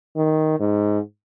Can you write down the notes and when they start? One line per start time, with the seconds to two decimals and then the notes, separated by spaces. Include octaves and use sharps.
0.16 D#3
0.60 G#2